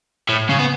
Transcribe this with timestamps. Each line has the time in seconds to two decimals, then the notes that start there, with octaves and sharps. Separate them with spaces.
0.29 A2
0.49 C#3
0.59 B3